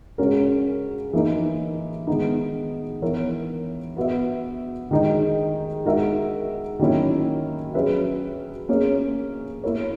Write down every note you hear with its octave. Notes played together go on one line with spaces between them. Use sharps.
C#3 G#3 C#4 F#4 A#4
E3 A#3 D#4 A#4
D#3 G#3 B3 D#4
E3 B3 E4 A#4 C#5
B3 F#4 B4 E5
D#3 G#3 D#4 G#4 D#5
G#3 D#4 F#4 A#4 E5
D#3 F#3 A#3 C#4 E4
F#3 C#4 G#4 B4 E5
A#3 C#4 G#4 C#5
A#3 E4 A#4 C#5